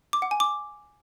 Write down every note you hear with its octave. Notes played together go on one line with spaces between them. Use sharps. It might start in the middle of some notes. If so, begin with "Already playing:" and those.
D6
F#5
G#5
D6